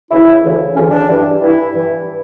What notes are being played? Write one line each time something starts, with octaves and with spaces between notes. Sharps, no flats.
D2 C#3 E3 E4
D2 C#3 E3
D2 C#3 E3 C#4
D4
G2 E3
G2 E3 E4
G2 E3